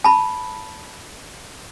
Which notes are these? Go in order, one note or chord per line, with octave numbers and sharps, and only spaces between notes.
A5 B5